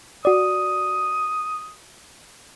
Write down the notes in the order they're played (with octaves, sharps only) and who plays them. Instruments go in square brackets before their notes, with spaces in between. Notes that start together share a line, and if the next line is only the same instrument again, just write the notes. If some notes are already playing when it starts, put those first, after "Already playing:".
[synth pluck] F#4 D5 [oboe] D#6